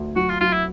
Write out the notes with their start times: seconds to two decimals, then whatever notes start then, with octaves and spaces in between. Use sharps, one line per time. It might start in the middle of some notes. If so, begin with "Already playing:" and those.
Already playing: D2
0.16 F#3 F#4
0.29 F4
0.40 F#3 F4
0.53 E4